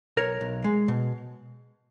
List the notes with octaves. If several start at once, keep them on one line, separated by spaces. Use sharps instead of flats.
B1 A#4 C#5
B1
G#3
B2